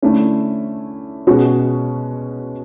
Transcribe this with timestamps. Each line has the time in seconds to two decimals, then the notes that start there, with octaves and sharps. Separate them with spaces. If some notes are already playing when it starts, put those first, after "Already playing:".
0.02 D3 A3 C#4 E4
1.27 B2 G#3 C#4 F#4